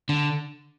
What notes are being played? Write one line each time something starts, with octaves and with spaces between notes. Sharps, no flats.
D3